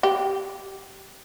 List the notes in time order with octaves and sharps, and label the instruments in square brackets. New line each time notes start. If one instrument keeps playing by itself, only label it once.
[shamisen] G4